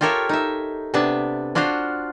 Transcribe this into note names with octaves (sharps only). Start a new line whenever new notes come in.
F4 G4 A4 A#4 C#5 E5
D#4 E5
C3 B3 D4 E5 A5
D4 F4 F#4 C5 F5